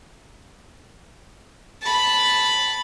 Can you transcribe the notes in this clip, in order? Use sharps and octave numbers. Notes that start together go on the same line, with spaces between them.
A5 B5